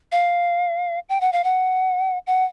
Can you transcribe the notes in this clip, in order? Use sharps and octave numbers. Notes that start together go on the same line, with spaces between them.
F5
G5
F#5
F5
F#5
F#5